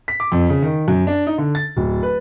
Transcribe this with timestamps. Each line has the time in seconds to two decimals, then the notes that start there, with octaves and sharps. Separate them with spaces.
0.08 B6
0.20 D6
0.32 F2
0.49 C#3
0.62 D#3
0.88 F#2
1.07 D4
1.27 D#4
1.38 D3
1.55 A6
1.77 D1
2.03 B4